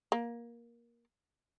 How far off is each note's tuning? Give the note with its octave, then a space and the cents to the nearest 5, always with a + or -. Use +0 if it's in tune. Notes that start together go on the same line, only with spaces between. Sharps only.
A#3 +15